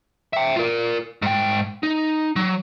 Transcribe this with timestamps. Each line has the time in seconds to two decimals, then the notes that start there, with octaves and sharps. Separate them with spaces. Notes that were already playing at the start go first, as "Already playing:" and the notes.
0.33 E5 G5
0.56 F4 A#4
1.22 G#2 G5
1.83 D#4
2.36 F#3